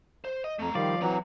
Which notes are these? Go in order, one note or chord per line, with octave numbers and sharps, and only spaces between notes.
C5
D#5
F2 A3 A#5
D#3 F3 G3 D5 F5
E3 F#3 C4 A#5